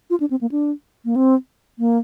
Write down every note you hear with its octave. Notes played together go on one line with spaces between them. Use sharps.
F4
D4
C4
A#3
D4
A#3
C4
A#3